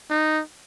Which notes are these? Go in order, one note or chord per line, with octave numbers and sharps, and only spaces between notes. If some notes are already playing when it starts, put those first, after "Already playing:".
D#4